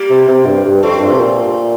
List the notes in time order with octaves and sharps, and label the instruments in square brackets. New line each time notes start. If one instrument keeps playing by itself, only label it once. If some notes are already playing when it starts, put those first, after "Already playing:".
Already playing: [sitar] G3 A#3
[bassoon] C3
C3
G2
G2
[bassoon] F2 [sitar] A3 C4
[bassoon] G2
C3
A#2